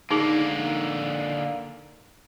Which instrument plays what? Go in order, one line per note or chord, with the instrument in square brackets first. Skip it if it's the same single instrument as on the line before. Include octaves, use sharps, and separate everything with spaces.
[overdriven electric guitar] D3 A#3 [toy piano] D#4 G#4